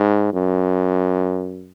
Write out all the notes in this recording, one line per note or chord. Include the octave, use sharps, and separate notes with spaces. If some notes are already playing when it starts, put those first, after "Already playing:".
Already playing: G#2
F#2